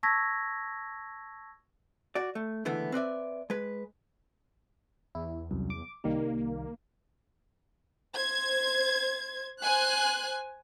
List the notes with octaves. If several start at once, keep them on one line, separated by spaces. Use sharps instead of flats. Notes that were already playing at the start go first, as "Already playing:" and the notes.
A5 C#6 E6 G#6 A#6 B6
F#4 D5
A3
C#2 D3 E3 A3 B3
C4 B4 D5 E5
G#3 B4
E2 E4
C2 F#2
D6
C2 D#3 G3 A#3
C5 G#6
C5 G#5 F#6